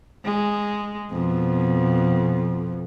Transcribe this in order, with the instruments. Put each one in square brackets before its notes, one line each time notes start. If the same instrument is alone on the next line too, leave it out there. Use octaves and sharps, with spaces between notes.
[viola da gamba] G#3
F2 B2